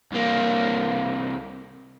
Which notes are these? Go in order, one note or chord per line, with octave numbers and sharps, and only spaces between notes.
C2 A#3